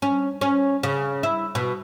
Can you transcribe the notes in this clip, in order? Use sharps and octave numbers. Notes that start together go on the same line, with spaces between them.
C#4
C#4
C#3
E4
B2